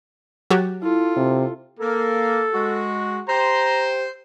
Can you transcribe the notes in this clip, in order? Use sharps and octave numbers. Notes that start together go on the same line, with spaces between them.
F#3 F#4 G4 F#6 A6
E4 F4 A4
C3
A#3 A4
G#3 F#4
G4 C5 A#5